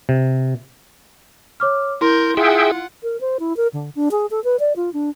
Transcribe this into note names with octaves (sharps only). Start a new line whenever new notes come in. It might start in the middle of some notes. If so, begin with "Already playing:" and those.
C3
C#5 D6 F6
E4 A#4 C6 G6
F4 G#4 E5 F#5 G5
A#4
C5
E4
A#4
D3
D4
G#4
A4
B4
D5
F4
D4